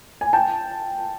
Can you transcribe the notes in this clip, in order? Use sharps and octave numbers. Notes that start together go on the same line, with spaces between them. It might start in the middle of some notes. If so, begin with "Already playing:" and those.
G#5
G5 A5